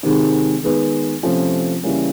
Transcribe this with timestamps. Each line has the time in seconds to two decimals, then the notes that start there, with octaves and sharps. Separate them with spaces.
0.03 C3 D#3 G#3
0.63 D#3 G#3 B3
1.23 C3 F3 A3 C#4
1.83 C#3 E3 G3 A#3 C#4